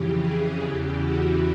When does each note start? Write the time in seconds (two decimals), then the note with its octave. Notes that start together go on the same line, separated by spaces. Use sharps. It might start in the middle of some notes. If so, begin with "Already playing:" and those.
Already playing: F2 C#3 E3 G4
0.18 G#4
0.59 E2 C#3 E3 G4
1.01 F#4